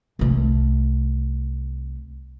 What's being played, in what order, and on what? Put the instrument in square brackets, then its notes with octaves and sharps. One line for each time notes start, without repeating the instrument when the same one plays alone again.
[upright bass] C2 A3